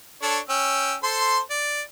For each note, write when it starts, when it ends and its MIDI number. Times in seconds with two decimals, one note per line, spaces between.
0.22 0.39 62
0.22 0.39 69
0.22 0.39 73
0.49 0.94 61
0.49 0.94 79
0.49 0.94 88
1.03 1.39 69
1.03 1.39 72
1.03 1.39 84
1.50 1.82 74